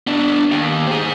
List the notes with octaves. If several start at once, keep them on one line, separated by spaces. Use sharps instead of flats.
B3 D4
D#2
G#4 C5